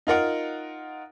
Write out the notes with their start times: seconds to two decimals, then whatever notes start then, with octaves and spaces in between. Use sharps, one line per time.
0.07 D#4 F4 A#4 F#5